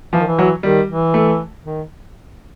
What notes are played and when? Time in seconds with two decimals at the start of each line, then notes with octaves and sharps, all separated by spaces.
0.13 E3 F3
0.20 D#3
0.27 E3
0.39 F#3
0.63 D#3 G3
0.88 E3
1.14 A3
1.64 D#3